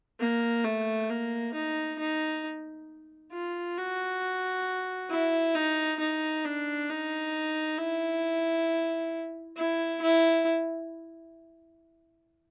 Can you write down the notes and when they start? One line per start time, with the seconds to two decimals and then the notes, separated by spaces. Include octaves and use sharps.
0.20 A#3
0.64 A3
1.10 A#3
1.54 D#4
1.99 D#4
3.32 F4
3.78 F#4
5.11 E4
5.55 D#4
5.99 D#4
6.45 D4
6.90 D#4
7.78 E4
9.57 E4
10.02 E4